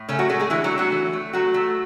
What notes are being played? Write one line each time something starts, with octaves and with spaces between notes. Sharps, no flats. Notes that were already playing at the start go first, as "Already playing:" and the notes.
Already playing: A2
C#3 A3 C#4
F#3 F#4
G#3 A3 G#4
G#3 G#4
D3 E3 E4
F#3 F#4
A3
F#3 F#4
E3
A3
F#3 A3 F#4
A3